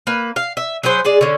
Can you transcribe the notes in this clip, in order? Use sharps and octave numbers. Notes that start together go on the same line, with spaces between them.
A#3 B4
F5
E5
F#3 G#4 B4 C5
G#3 G#4 D5
D3 C#4